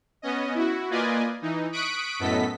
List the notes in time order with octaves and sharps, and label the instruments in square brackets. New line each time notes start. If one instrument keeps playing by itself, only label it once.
[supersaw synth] B3 C#4 D#5
E4 F#4
A#3 F4 B4 D5 D#5 G#5
E3 D#4
C#6 D#6 F#6 B6 D7
F#2 A2 B3 A4 D#5 B6